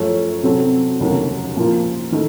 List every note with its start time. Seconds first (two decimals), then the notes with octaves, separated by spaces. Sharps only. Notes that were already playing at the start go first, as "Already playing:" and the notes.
Already playing: F#2 F3 A3 C#4
0.43 C3 F#3 C4 F#4 A4
1.00 F1 D#2 C#3 F#3 A#3
1.57 A#2 F3 A#3 F4
2.12 D#3 A3